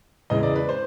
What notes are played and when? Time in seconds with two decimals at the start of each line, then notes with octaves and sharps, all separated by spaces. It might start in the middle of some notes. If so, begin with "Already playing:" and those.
0.30 E2 C#3 E3 G#3 D#5
0.43 D5
0.56 B4
0.69 C5